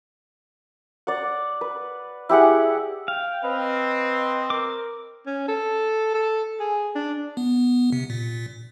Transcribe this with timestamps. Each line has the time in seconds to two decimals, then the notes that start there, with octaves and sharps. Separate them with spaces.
1.07 D5 F#5
1.61 B4
2.29 E4 G4 G#4 F#5
3.08 F5 G5
3.44 C4 B4 D#5
4.50 A#4 D6
5.26 C#4
5.48 A4
6.14 A4
6.60 G#4
6.95 D4
7.37 B3
7.92 C3
8.10 A#2